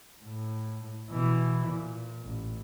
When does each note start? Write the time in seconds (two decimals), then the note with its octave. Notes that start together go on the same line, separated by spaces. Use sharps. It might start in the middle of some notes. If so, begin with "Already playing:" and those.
0.23 A2
1.10 B2 E3
1.69 A#2
2.24 A1